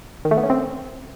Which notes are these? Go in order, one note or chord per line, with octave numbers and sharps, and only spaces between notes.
D#3
A3
B3
C#4
C4